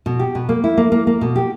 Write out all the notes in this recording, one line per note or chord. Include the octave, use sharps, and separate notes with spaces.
B2
G4
B2
A#3
E4
A#3
A#3
A#3
B2
G4